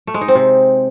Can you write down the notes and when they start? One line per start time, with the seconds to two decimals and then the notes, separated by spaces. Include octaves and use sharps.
0.07 A3
0.14 G#3
0.21 D#4
0.28 C4
0.35 C3